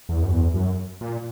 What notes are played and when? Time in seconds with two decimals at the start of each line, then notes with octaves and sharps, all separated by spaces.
0.09 E2
0.23 F#2
0.32 E2
0.54 F#2
1.01 A#2